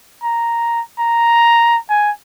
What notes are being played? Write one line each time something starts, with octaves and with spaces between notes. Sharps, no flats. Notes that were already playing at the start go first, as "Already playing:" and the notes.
A#5
A#5
G#5